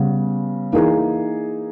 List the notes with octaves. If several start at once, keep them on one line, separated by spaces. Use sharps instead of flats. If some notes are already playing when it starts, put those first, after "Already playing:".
Already playing: C#3 G3 B3
E3 A#3 D#4 G#4